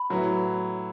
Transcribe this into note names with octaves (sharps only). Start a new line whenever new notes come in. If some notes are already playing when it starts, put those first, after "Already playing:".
Already playing: B5
A2 F#3 B3 E4